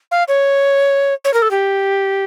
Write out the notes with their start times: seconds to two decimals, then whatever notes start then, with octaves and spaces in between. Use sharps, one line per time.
0.11 F5
0.28 C#5
1.24 C#5
1.34 A#4
1.42 A4
1.51 G4